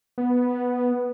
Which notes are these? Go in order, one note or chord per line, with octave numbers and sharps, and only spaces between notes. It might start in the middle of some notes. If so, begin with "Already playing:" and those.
B3